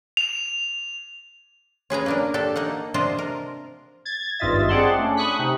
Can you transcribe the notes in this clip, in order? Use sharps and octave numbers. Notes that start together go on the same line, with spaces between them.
F7
C#4 G#4 B4 A#5
A#3 D4 A#4
D4 G4 A4
A#3 D#4 F#5
C3 D4 F4 C5 D#5
A#4
G#6 A6
G#1 G2 F4 D#5 E5 A6
C4 G#4 D5 F#5 A5 C6
A3 C#4 D4
B5 C#6 D#6 F#6 B6
C3 D#4